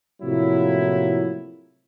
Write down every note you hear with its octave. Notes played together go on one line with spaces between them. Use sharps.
A2 C3 F3 F#3 A#3 E4